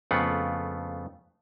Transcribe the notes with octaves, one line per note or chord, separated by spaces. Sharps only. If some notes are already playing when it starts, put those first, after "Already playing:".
F2 C#3 A3 B3 F4 F#5